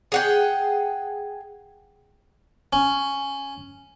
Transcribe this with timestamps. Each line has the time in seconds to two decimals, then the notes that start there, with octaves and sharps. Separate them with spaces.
0.12 G#4 F#5 G5
2.73 C#4